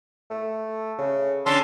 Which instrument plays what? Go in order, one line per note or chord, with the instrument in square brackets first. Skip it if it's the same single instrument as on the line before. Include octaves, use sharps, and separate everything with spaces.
[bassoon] A3
C#3
[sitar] D3 C#4 [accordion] A5 C6 E6